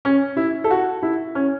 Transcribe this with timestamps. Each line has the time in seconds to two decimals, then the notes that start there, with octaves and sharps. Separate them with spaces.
0.05 C#4
0.37 E4
0.64 A4
0.70 F#4
1.03 E4
1.35 C#4